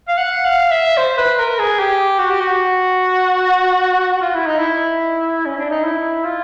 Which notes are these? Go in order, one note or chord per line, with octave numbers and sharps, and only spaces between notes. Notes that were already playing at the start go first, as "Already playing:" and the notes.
F5
F#5
F5
E5
C5
B4
A#4
G#4
G4
F#4
G4
F#4
F4
E4
D#4
E4
C#4
D4
D#4
E4
F4